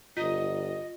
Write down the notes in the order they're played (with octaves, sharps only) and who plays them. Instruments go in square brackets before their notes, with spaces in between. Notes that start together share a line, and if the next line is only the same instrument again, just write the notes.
[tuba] G1 [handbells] F4 [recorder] D#5